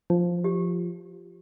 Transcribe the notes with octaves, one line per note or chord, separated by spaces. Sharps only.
F3
G4